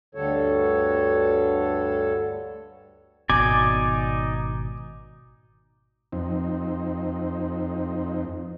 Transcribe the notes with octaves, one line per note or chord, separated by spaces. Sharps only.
D2 G2 D3 G3 A4 C#5
G#1 B2 D#4 D5 G#5 D6
F2 C4 D#4